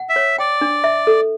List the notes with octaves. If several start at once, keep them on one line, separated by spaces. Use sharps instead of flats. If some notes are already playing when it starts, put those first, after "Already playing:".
Already playing: F#5
E5
C#5
D5 G5
D4
E5
A4